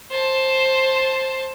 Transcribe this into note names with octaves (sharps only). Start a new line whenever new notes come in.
C5 A5